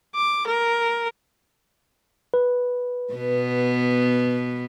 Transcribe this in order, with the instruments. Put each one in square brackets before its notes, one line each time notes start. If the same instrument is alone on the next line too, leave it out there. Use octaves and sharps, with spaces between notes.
[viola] D6
A#4
[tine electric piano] B4
[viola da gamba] B2 B3